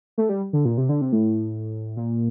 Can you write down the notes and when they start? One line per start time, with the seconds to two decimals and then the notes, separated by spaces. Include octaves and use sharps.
0.18 A3
0.29 G3
0.53 D3
0.65 A#2
0.78 C3
0.89 D3
1.01 C3
1.12 A2
1.97 A#2